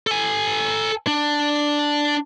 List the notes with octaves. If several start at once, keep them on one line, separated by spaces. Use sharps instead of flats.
A4 G#5
D4